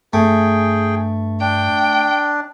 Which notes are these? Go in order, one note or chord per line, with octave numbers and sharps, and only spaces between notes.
G2 A3 G#4 G5
D4 G5